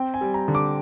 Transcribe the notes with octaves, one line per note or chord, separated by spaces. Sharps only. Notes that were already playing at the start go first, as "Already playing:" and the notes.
Already playing: C4 G5
G#5
G3
A#5
D3
D6